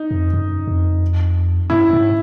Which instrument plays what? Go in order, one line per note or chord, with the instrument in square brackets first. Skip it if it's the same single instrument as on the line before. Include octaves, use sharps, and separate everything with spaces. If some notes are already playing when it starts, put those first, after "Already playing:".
Already playing: [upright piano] D#4
[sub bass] F2
F#2
F2
[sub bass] G2 [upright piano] E4
[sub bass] G#2